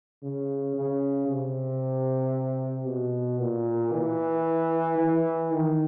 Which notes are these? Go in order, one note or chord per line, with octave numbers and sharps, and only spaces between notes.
C#3
C#3
C3
B2
A#2
E3
E3
D#3